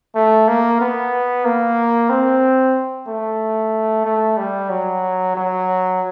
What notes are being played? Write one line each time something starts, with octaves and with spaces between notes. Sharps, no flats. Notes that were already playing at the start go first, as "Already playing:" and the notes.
A3
A#3
B3
A#3
C4
A3
A3
G3
F#3
F#3